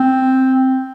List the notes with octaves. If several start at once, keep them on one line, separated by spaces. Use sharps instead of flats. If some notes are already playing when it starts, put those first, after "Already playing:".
Already playing: C4